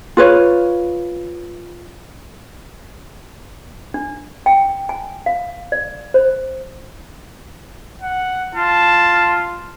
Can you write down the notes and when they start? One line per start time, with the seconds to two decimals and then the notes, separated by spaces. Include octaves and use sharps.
0.17 F4 B4 C#5
3.94 D4
4.46 G5
4.89 G#5
5.26 F5
5.72 D5
6.14 C5
8.02 F#5
8.55 F4 A5